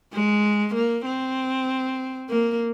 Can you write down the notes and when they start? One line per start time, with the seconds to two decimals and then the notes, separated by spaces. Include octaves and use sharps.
0.13 G#3
0.74 A#3
1.05 C4
2.29 A#3